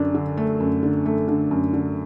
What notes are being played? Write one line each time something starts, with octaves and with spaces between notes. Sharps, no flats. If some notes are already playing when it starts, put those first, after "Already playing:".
Already playing: F#2 D3 D4
D3
A3
F#2
D3
A3
D3
F#2
D3